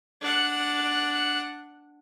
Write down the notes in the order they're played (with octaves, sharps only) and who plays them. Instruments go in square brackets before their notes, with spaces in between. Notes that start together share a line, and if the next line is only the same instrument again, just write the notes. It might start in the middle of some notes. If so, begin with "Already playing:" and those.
[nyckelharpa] D4 F#5